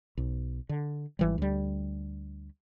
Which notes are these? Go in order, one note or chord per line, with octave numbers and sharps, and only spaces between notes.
B1
D3
G#1 E3 G3
D2 G3